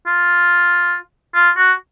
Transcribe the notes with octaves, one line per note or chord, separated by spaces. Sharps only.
F4
F4
F#4